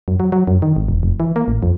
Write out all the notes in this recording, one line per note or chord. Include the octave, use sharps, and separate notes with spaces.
F#2
F#3
F#3
F#2
D#3
G#1
E1
F1
E3
A#3
A1
F2